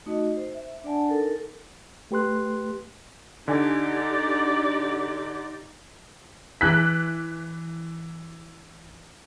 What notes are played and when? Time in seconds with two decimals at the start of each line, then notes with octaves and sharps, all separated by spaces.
0.06 A3 D#4 F#4 D#5
0.36 C5
0.55 E5
0.84 D4 D5 F#5 G#5 A5
1.09 D#4 A4 A#4
2.11 A3 G4 B4 C6 F#6
3.48 D3 D#4 G4 D5 G#5
6.61 E3 F#6 B6